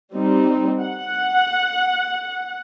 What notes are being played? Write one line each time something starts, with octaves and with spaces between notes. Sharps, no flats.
G3 C4 D#4
F#5